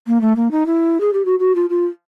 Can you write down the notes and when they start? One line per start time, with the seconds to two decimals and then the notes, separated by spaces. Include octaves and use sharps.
0.07 A#3
0.21 A3
0.36 A#3
0.51 D#4
0.66 E4
1.00 G#4
1.13 G4
1.25 F#4
1.39 F#4
1.55 F4
1.70 F4